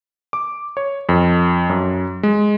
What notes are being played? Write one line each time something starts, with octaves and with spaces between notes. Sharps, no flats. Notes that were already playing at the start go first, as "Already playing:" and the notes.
D6
C#5
F2
F#2
G#3